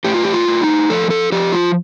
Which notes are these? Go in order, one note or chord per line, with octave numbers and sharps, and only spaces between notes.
A2 G4
F4
G4
F4
A2
D#4
F3 A4
A4
F3 G4
F4